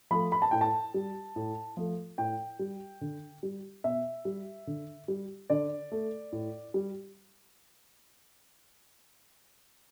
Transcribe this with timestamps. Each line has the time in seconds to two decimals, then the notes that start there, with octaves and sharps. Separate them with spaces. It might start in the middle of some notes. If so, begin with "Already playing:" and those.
0.11 F3 A3 B5
0.32 B5
0.42 A5
0.51 A2 G5
0.61 A5
0.94 G3
1.36 A2
1.77 F3 A3
2.18 A2 G5
2.59 G3
3.01 D3
3.43 G3
3.84 B2 E5
4.25 G3
4.67 D3
5.08 G3
5.50 D3 D5
5.92 A3
6.32 A2
6.74 G3